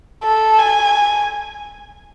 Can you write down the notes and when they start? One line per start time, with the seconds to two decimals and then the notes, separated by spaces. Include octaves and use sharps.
0.24 A4
0.58 G#5